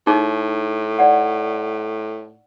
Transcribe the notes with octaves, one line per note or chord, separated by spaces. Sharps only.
A2 D#4 G#4
D5 F#5